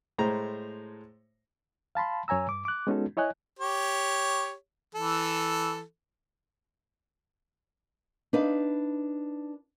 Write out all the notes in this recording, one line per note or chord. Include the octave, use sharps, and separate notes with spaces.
A2 G#3 C5 A#5
F5 A5 B5 C6
F#2 C#5 G#5 A#5 E6
G2 D6
D6 F#6
G#3 B3 C#4 D#4 F#4 A4
E4 C#5 D#5 G#5 F#6
G4 C#5
E3 A4
D4 D#4 B4 F5